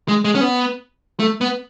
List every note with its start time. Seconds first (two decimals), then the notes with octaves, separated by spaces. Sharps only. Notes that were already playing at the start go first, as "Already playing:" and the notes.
0.08 G#3
0.25 G#3
0.35 C#4
0.41 B3
1.20 A3
1.41 B3